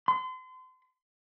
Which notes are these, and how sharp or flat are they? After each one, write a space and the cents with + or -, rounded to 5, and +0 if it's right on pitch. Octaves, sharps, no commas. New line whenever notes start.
C6 -35